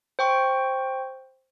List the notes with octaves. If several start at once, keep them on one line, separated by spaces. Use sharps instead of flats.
C5 G5 C#6